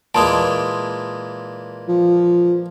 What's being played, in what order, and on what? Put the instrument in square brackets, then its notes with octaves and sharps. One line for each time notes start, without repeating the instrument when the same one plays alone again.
[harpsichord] A#2 E3 G#3 [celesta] A5 C6 D#6
[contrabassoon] F3